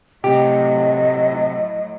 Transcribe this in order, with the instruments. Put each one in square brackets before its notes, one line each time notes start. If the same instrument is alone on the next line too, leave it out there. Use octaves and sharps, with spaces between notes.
[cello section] A2 F#3 [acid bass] C3 [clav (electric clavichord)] G4 [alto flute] D#5